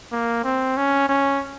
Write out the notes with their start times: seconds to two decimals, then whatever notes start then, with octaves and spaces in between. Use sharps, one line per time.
0.12 A#3
0.44 C4
0.77 C#4
1.09 C#4